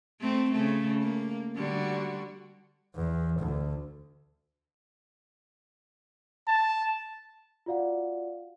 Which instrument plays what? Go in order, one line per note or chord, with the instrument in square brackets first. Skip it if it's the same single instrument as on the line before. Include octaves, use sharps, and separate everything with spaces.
[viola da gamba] A3 C4
C#3 A3
A#3
D3 G3 F#4
[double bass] E2
D2
[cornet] A5
[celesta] F4 F#4 D5 F5 F#5